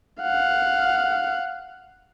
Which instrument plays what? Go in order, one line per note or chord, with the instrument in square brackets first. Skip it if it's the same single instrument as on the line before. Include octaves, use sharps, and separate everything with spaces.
[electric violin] F5 F#5